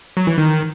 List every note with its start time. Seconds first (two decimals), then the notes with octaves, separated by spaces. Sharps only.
0.17 F#3
0.27 E3
0.38 D#3